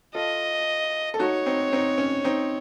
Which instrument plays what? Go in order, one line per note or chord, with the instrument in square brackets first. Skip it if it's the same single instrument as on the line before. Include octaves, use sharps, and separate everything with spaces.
[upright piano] F4 A4 [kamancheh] D#5
[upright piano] A4
[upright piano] D#4 F#4 [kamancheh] C#5
[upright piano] C4 D#4
C4 D#4
C#4
C4 D#4